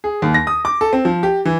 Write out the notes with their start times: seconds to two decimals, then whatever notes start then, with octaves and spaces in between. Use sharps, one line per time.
0.04 G#4
0.22 D#2
0.34 A#6
0.47 D#6
0.65 D6
0.81 A4
0.93 C4
1.05 F3
1.23 G4
1.45 E3